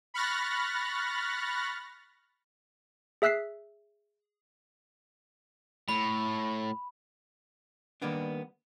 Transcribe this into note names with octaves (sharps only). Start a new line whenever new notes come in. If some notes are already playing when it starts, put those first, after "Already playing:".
B5 C#6 F6 F#6 A6 A#6
G#4 E5 E6 F#6 B6 C7
A2 B5
D#3 G3 A#3 B3 D4